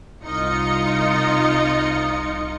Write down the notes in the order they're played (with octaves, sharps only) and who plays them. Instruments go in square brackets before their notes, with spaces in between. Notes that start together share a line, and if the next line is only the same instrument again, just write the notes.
[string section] C2 D#4 F4 D#5 C#7